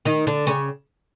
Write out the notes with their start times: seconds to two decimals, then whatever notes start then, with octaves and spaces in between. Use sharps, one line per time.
0.05 D#3 D#4
0.27 D3 D4
0.47 C#3 C#4